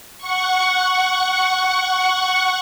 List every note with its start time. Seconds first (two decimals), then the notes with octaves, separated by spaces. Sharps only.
0.17 F#5 C#6